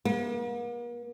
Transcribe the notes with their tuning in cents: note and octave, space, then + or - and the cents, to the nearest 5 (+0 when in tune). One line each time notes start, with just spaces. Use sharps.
A#3 +45